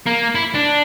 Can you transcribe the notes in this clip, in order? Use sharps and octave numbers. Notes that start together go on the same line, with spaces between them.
A#3
E4
D4